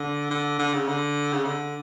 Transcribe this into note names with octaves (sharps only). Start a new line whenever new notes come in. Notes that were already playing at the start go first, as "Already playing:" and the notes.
Already playing: D3
D3
D3
C#3
D3
C#3
D3